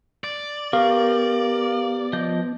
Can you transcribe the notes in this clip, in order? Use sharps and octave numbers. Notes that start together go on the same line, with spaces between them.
D5
B3 G4 A#4 F5 C#6
F3 D#5 G6